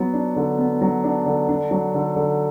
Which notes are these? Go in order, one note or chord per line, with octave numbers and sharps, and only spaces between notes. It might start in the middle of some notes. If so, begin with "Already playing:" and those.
Already playing: F#3 B3
D4
D3
B3
F#3
D4
D3
D4
F#3
D3
D3